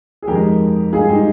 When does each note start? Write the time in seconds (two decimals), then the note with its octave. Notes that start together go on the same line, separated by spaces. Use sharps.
0.22 G#4
0.28 F2 D#3 G#3 G4 A#4
0.93 G#2 G3 F4 G#4
1.09 D#4 G4